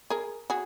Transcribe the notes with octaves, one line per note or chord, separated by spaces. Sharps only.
G#4 A#4
F#4 G#4